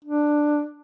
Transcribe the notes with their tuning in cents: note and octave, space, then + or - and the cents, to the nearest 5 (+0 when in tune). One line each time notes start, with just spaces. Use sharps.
D4 +10